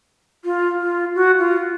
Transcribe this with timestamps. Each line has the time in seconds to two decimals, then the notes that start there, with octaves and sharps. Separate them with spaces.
0.45 F4
0.80 F4
1.15 F#4
1.39 F4